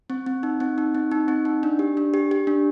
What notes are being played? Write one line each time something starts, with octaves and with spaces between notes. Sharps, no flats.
C4
C4
D#4
C4
D#4
C4
D#4
C4
D#4
D4
G4
D4
G4
G4
D4